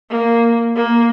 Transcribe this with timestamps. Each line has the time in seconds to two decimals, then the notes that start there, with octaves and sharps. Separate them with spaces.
0.10 A#3
0.75 A#3